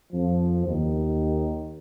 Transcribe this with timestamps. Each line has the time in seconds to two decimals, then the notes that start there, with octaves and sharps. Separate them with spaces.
0.13 F2 F3
0.66 D#2 D#3